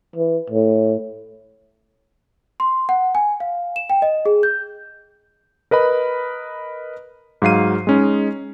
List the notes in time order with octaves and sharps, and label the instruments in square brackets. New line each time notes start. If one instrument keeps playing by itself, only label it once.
[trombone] E3
A2
[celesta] C6
F#5
G#5
F5
E7
G5
D#5
G#4
G6
[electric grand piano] A#4 B4 D#5 B5
G#2 F#3 F5 C7 D#7
G#3 C#4 D#4